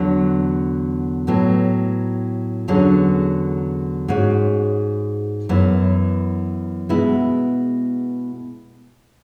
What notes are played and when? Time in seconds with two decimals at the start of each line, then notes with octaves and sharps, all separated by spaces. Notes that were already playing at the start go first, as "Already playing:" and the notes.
Already playing: E2 D3 F#3
1.27 A2 F#3 B3
2.68 E2 D3 F#3 C#4 G#4
4.08 G#2 G#3 C#4 F#4
5.49 F#2 E3 B3
6.89 B2 G#3 B3 E4